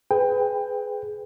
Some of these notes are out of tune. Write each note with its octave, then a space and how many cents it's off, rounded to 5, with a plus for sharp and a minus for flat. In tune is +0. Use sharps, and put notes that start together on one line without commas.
G#4 +20 B4 +25 G5 +20